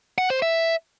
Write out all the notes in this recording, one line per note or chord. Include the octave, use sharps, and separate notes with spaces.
F#5
C5
E5